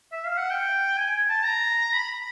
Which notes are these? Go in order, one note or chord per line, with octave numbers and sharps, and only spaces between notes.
E5
F5
F#5
G5
G#5
A5
A#5
B5